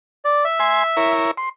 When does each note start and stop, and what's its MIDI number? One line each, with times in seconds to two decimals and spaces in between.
0.25 0.44 74
0.45 1.13 76
0.60 0.83 80
0.60 0.83 84
0.97 1.31 64
0.97 1.31 70
0.97 1.31 73
1.37 1.49 84